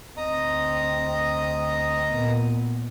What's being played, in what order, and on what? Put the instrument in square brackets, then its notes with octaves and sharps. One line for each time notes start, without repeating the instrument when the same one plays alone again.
[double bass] D2 C4 [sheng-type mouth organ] D#5 A#5 D#6
[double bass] A#2 B3